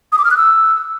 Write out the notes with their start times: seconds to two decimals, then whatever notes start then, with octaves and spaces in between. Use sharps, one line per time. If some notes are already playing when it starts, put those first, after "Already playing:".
0.12 D#6
0.18 D6
0.24 F6
0.31 F#6
0.37 E6